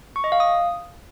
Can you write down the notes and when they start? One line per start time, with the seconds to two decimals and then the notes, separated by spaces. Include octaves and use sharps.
0.16 C#6
0.24 D#5
0.32 F5
0.40 D#6